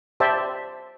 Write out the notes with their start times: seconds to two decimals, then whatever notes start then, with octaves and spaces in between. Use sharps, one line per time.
0.20 G4 C5 D5 E5 A5